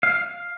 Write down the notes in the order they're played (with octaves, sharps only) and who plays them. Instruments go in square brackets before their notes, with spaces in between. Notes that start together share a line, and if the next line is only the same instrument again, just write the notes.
[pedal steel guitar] F5